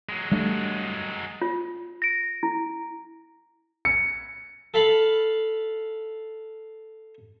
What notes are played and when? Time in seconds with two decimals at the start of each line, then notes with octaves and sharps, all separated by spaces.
0.09 F#3 G#3
0.32 G3 A3 D4
1.42 F4
2.02 A#6 D7
2.43 E4
3.85 C#7
4.74 A4 F5 A5 B5